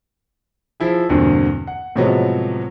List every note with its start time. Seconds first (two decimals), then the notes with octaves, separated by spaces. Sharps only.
0.80 F3 E4 G#4
1.09 E2 G2 B2 D3 A#3 C4
1.67 F#5
1.95 A2 C3 F3 F#3 G#3 B3